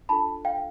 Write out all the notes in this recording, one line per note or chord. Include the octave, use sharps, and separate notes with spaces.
D4 F4 A4 A5 B5
F5 G5